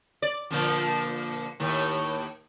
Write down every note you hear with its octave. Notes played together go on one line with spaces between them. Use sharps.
D5
A#2 D3 F3
D#2 A2